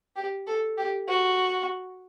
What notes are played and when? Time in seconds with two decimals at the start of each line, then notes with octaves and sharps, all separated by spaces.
0.16 G4
0.47 A4
0.78 G4
1.08 F#4